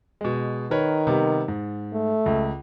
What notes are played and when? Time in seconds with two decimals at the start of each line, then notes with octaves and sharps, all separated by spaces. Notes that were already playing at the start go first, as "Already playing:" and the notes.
0.21 B2 G#3
0.71 D#3 A#4 B4 C#5
1.07 C3 G3 B3
1.48 G#2
1.93 A3
2.26 C#2